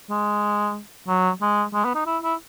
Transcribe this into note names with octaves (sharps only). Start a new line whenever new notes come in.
G#3
F#3
G#3
G#3
B3
D#4
E4
E4